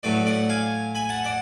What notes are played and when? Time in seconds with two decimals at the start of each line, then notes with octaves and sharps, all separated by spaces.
0.03 A2 F#3 A3 B4 D5
0.26 D5 F#5
0.49 F5 G#5
0.95 G#5 B5
1.09 F#5 A5
1.24 D5 F#5